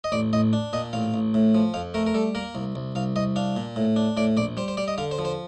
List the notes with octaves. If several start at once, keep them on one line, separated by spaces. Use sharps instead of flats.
D#5
A1 D5
A1 D#5
D4
A#2 D#5
A1 F5
A1
A2
F3
F2 F5
A3 A#4
A#4
G3 A4
A#3 A#4
C2
C2
C2 F5
C2 D#5
D4 F5
A#2
A2
D4
A2 D5
A#1 D5
G3 C5
C5
G3 D5
D#5
D3 F5
C5
F3
C5